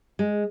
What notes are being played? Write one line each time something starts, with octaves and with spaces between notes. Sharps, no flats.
G#3